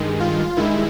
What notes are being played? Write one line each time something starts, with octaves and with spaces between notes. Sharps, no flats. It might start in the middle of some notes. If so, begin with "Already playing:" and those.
Already playing: G2 D#3 G#3
F4
G2 D#3 G#3 E4